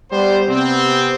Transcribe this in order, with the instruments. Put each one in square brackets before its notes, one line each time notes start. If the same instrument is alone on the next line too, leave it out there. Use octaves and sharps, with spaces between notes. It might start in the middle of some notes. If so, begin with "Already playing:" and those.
[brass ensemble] G3 B3 C5
C3 B3 C4